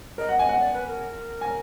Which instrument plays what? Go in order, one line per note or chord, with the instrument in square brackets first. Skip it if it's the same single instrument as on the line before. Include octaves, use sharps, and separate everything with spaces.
[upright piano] A#4 [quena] D#5
[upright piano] F#5
[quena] D#5 [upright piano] G#5
[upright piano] F#5
[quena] D5
B4
A#4
[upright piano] G#5